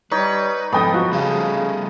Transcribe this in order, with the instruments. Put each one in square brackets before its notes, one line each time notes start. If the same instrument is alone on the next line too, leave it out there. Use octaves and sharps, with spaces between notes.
[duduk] G3 [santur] D#4 C#5 [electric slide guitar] B4
[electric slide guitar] F2 G#2 [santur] B3 D#5 D#6 [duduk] A4 [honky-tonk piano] G5 B5
[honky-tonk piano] F3 [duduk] F#4
[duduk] C#3 [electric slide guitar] G3 G#4 A4